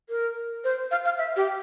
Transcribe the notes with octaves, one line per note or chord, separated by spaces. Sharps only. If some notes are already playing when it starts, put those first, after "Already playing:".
A#4
C5
F5
F5
E5
G4